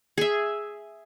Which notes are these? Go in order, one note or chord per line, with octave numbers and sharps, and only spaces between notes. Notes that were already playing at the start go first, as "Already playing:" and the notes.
G#4 E5